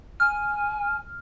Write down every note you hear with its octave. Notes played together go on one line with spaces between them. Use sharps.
G#5 F6